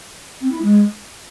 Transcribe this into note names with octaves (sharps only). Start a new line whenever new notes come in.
C4
E4
G#3